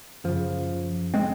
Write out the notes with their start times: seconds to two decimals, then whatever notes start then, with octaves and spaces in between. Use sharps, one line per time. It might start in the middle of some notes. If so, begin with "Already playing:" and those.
0.24 F#2 C#3 F3
1.14 G#3 C4